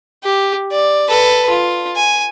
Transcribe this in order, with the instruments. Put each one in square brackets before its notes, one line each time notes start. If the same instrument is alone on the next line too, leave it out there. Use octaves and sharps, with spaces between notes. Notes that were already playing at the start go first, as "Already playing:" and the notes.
[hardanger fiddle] G4
D5
A4 B4
F4
G#5